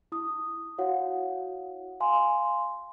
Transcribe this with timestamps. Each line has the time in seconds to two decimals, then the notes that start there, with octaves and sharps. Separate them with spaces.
0.12 E4 D#6
0.78 E4 F#4 C#5 F5 F#5
2.00 F5 G#5 C6